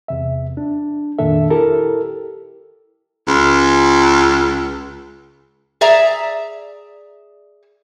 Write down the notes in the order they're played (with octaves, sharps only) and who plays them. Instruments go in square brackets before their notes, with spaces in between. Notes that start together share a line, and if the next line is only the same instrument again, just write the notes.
[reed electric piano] E2 C3 E5
D4
F2 A#2 D#3 D4 A4 E5
E4 G4 A4 A#4
[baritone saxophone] C#2
[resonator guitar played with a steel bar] G#4 D5 E5 A#5